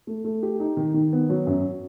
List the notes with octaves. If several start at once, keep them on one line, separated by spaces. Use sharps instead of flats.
A3
A3
G4
D#4
D#3
D#3
B3
F#3
F#2